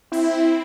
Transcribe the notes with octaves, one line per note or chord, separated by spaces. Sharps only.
C4 E4